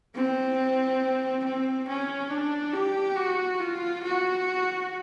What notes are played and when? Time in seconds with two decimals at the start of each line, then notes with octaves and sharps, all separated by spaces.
0.15 C4
1.44 C4
1.88 C#4
2.30 D4
2.73 G4
3.16 F#4
3.60 F4
4.03 F#4